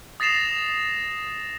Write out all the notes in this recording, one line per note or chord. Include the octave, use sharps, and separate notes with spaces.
D#6 A6 A#6 C7 E7 F7